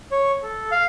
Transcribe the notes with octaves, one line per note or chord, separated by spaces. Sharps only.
C#5
A4
F5